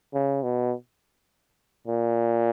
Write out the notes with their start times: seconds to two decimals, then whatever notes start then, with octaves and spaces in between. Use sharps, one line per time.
0.14 C#3
0.43 B2
1.87 A#2